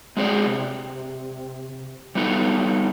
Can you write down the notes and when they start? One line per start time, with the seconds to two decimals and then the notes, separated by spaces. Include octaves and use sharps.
0.17 G#3 C4 G#4 C#5 D5
0.47 C3
2.15 G3 B3 D#4 A4